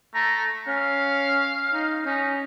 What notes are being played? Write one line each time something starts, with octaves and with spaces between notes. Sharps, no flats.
A3 A#5
C#4 F5
D#4
C#4 D#4